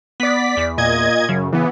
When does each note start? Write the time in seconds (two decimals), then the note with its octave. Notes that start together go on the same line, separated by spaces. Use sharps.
0.20 B3 D5 B6
0.57 E2
0.78 A#2 D#5 G#6
1.29 F#2 C#3
1.53 E3 B3